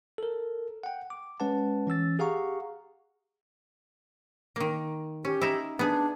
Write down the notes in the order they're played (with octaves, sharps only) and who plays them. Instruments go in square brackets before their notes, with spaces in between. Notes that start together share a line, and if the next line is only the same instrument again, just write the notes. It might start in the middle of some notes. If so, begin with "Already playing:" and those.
[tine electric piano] A4 A#4
F#5 G5
D6
G#3 C#4 B4 F#5 A5
E3 C#4 E6 A6
G4 G#4 F5 F#5 A#5 C#6
[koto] D#3 A#3
[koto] C#4 [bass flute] G4
[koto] D#4 E4
[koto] B3 G#4 [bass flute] D4